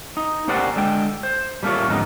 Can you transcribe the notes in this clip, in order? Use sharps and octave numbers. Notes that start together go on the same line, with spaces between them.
D#4
A#3 C#4 G4 C5 D5 F#5
D3 G#3 G5
C5
G3 A3 A#3 C#4 F4 C#5
F2 G#2 D3 G3 B3 D#4